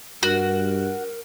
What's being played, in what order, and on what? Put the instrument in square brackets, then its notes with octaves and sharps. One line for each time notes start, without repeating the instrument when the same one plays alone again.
[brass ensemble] G2 [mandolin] F#4 [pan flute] A#4